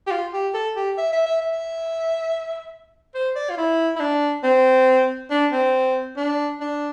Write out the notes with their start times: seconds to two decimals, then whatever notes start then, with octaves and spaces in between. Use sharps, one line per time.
0.07 G4
0.11 F4
0.33 G4
0.54 A4
0.76 G4
0.98 E5
1.12 E5
1.26 E5
1.41 E5
3.14 C5
3.36 D5
3.50 F4
3.58 E4
3.96 E4
4.00 D4
4.43 C4
5.30 D4
5.52 C4
6.17 D4
6.60 D4